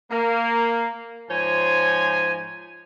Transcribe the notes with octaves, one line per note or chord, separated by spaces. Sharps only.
A#3
G#2 F3 C5 C#5 G#5